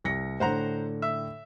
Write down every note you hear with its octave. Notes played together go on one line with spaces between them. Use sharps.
C2 A#6 C#7
A2 D3 C5 F#5 A#5
E5